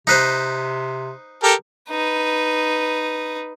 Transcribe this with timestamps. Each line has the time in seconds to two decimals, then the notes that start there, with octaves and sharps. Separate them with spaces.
0.07 C3 D#4 B4 C5
1.43 G4 A4 A#4
1.90 D#4 B4